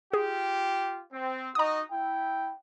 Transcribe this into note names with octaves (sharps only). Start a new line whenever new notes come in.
F4 G4 G#4
C4
D#4 F#4 D#5 A#5 D#6
E4 G5